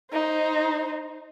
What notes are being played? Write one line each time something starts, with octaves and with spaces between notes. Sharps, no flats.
D#4 C5